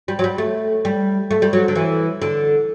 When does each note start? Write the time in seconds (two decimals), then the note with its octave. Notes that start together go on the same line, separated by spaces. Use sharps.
0.08 G3
0.19 F#3
0.24 G3
0.38 A3
0.85 G3
1.31 A3
1.42 G3
1.53 F#3
1.68 D3
1.75 E3
2.22 D3